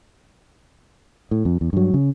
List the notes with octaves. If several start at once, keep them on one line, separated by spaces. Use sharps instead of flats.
A2
F2
E2
G2 F#3
C#3